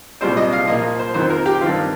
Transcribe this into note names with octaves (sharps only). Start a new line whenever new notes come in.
C2 A#2 G3 C4 C5
D#5
F5
A#2 F3 A#3 D#5
C5
F2 D#3 C4 C5
A#4
G4
G2 D#3 C4 F4